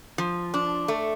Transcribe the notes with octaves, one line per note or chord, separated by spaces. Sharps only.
F3
D4
A3